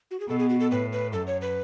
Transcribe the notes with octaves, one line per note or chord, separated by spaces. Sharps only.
F#4
G#4
B2 A4
G#4
F#4
A4
A2 B4
B4
F#2 A4
C#5
B4